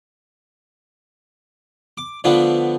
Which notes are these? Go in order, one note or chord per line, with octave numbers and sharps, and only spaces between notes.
D6
D3 F3 A3 B3 D4